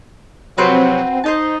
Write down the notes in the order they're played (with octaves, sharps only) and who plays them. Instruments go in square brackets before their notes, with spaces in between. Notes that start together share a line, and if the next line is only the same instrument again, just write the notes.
[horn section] C3 F3 F#3 [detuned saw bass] C4 [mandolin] F#4 B4 C5
[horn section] D#4 [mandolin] C5 D#5 A5